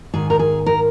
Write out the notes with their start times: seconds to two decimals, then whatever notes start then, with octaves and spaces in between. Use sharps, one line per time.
0.14 G#2 D#3 G#4
0.30 A#4
0.39 G#4
0.66 A#4